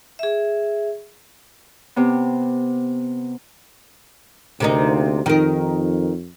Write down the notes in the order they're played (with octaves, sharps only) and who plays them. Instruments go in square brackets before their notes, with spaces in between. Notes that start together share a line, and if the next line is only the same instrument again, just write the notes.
[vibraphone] G#4 E5
[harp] C3 B3
[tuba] D2 [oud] C3 A#3 D#4
[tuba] F2 [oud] D#3 A#4